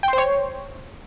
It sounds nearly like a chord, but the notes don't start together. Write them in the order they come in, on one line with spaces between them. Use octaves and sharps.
G5 C6 C5 C#5